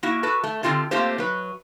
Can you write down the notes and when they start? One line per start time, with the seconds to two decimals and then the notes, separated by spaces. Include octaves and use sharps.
0.03 A#3 E4 F#4
0.23 F#4 A4 B4
0.44 A3
0.63 D3 C4 F4 G4 A4
0.91 A3 A#3 C4 F4 G4 C5
1.18 F#3 B4